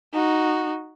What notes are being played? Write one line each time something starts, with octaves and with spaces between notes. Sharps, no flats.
D#4 F#4